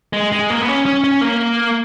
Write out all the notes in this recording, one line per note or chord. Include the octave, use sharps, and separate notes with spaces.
G#3
G#3
A#3
B3
C#4
C#4
C#4
A#3